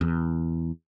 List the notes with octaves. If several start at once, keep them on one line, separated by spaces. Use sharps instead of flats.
E2